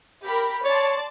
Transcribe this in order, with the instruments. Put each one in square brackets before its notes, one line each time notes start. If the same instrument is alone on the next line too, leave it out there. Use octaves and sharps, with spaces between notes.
[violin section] G4 A#4 B5
[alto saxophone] C#5 [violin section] D5 A5 C6